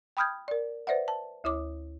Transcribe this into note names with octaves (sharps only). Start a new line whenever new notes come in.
G5 B5 D#6 F6 G6 G#6
A#4 D5
B4 C5 D5 E5 F#5
A5
D2 E4 C#5 D6